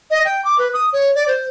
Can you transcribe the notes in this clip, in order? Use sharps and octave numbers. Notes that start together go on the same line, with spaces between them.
D#5
G5
D6
B4
D#6
C#5
D5
C5